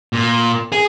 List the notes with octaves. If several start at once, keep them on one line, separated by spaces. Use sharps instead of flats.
A#2
G#4